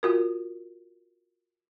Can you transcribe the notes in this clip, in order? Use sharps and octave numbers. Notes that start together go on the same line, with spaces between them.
F4 F#4 A#4